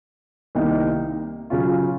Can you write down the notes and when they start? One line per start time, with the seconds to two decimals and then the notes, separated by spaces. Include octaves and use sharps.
0.55 C2 C3 D#3 A#3 D#4
1.50 C#3 F#3 C#4 F4